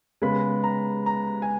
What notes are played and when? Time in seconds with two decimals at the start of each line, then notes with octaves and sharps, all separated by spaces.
0.22 C#3 G#3 B3 B5
0.64 A#5
1.06 A#5
1.42 G#5